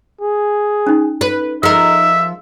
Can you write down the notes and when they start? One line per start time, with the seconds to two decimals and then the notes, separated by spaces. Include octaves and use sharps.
0.21 G#4
0.87 C#4 D#4
1.21 B4
1.63 F3 D#4 G#4 A#4 D#5 E5